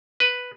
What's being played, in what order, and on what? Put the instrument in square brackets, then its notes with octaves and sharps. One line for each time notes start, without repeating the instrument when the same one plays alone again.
[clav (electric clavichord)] B4